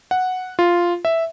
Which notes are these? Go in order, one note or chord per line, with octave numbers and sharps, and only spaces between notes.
F#5
F4
E5